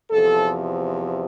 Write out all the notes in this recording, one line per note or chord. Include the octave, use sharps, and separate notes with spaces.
E2 C3 F3 A4